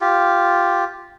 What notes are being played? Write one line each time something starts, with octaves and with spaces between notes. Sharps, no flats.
F4 G4